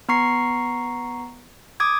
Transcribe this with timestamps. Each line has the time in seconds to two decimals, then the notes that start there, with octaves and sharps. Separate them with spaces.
0.09 B3 A#5 C#6 C7
1.80 D6 D#6 G#6